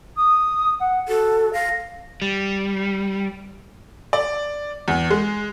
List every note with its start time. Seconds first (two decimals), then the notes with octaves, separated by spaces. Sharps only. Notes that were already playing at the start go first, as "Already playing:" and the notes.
0.17 D#6
0.80 F#5
1.08 F#4 A4
1.53 F5 A#6
2.22 G3
4.13 D5
4.88 E2
5.10 G#3